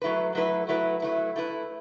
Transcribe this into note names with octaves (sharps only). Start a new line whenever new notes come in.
F#3 A3 E4 B4
F#3 A3 E4 B4
F#3 A3 E4 B4
F#3 A3 E4 B4
A3 E4 B4